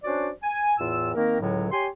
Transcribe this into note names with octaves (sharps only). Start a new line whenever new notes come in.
C#4 D4 F#4 C5 D5
G#5
E2 A2 F4 E6
D#3 A#3 C4 A#4
C#2 A2 D3 F#3
G4 C#5 G#5 C6